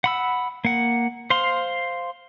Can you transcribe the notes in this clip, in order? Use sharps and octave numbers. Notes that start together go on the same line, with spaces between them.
F#5 B5 E6
A#3 F#5
C5 F5 C6